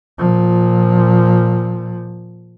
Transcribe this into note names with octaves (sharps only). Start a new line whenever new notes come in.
A#2 F3